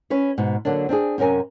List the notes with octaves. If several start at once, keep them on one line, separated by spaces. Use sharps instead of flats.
C#4 B4 C#5
G#2 B2
D3 F#3 A#3 D4
C4 D4 F4 G#4
F#2 C3 C#4 A#4 G#5